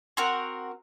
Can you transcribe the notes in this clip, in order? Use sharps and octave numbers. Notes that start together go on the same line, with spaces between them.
C4 F#4 A#4